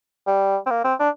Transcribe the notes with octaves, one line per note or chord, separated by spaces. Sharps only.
G3
C4
A#3
C4
D4